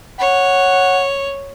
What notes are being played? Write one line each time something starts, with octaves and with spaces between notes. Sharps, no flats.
C#5 F#5